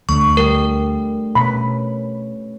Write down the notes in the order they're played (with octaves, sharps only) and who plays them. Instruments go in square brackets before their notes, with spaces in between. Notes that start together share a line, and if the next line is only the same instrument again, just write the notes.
[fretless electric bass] D2 [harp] A3 D4 [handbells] C#6
[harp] G3 [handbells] A#4
[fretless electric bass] B2 [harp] C#4 B4 [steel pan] B5